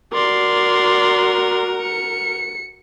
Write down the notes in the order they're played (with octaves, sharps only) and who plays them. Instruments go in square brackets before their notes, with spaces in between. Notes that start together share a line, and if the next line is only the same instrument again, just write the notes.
[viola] F#4 A#4 [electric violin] D5 C6
[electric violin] C#7